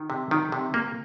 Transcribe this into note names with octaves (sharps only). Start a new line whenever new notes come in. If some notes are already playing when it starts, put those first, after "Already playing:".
Already playing: D#3
C3
D#3
C3
A#3